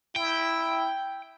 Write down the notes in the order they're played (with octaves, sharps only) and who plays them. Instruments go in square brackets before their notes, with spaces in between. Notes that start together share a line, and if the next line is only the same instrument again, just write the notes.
[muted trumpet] E4 [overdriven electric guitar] G5